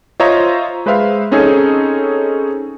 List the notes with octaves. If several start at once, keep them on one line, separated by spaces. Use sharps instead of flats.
F4 C5 C#5 D#5 E5 A#5
G#3 B4 C5 E5 F5
C4 C#4 D#4 G#4 A4 C#5